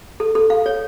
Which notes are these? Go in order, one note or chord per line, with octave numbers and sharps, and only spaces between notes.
A4
A4
F5
C#5